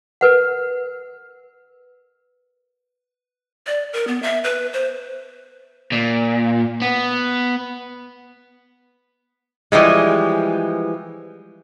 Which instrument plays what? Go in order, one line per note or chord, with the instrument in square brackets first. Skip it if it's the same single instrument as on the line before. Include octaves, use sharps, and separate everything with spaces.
[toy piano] A#4 B4 F#5
[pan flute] D5
A#4
B3
E5
B4
C5
[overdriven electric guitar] A#2
B3
[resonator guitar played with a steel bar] E3 F3 G3 G#3